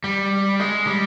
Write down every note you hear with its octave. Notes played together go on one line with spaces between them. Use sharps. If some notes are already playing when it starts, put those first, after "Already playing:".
G3
G#3
G3